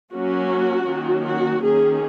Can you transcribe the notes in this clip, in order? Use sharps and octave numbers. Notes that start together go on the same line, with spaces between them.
F#3 A#3 C#4 F#4
D#3 F#3 A#3 C#4
F#4
D#3 A#3 C#4 G#4